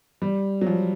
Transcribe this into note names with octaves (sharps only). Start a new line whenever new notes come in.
G3
F#3
F3